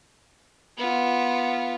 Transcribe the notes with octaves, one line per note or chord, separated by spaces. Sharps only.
B3 F4